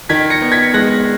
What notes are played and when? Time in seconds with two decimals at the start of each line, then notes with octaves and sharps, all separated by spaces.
0.09 D#3 G#6 B6
0.30 A#6 C#7
0.42 B3
0.52 G#6 B6
0.74 G#3 F#6 A#6